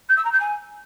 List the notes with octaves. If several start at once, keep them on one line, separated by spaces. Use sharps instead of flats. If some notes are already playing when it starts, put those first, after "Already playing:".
G6
E6
A#5
G6
G#5